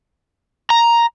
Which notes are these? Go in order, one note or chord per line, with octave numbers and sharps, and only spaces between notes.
A#5